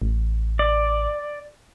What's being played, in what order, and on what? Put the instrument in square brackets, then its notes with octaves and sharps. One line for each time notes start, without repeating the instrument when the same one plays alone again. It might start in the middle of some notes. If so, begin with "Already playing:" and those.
[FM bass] A1
[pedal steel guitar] D5